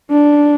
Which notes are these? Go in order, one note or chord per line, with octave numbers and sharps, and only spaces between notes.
D4